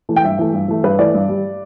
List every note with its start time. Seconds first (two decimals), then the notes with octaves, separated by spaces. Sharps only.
0.09 E3 A3
0.16 G5
0.24 G2 E5
0.39 E3 A3
0.53 G2
0.68 E3 A3
0.83 G2 B4
0.99 E3 A3 D5
1.14 G2
1.29 G3